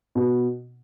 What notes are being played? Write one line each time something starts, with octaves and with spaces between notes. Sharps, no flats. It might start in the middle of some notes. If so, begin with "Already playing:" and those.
B2